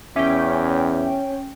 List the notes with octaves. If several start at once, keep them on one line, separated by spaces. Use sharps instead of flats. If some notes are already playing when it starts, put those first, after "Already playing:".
E2 C#4 E5 G5 D6